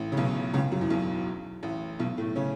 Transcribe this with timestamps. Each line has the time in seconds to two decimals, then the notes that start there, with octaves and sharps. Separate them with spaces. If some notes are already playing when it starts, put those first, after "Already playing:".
Already playing: A1 A2
0.12 C#3
0.17 B1 B2
0.54 C#2 C#3
0.72 F#2 F#3
0.81 E2 E3
0.90 B1 B2
1.63 A1 A2
1.99 B1 B2
2.17 A2 A3
2.36 C#3 C#4